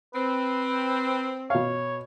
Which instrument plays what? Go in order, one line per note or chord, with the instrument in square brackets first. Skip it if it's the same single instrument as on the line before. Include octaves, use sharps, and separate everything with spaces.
[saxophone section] C4 [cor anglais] B4
[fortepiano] B2 F5 [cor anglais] C#5